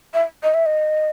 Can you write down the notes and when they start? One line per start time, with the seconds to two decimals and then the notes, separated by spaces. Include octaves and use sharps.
0.14 E5
0.43 D#5
0.54 E5
0.66 D#5